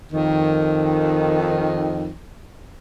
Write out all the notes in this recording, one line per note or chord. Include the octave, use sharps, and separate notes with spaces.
F2 D#3